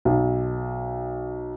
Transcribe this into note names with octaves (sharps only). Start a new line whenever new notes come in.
B1